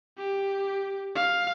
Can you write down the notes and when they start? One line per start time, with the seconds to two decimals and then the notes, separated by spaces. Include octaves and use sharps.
0.18 G4
1.15 F5